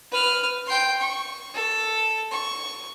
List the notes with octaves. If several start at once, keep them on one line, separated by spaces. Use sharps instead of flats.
B4 F6
G5 C6
C#6
A4
C#6